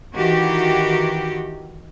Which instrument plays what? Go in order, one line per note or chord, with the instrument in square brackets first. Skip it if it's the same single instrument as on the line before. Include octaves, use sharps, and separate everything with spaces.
[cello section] D#3 E3 F#4 G4